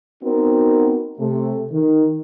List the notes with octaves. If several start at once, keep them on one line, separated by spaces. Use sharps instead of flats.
B3 C4 D#4 F#4 A#4
C3 A3
D#3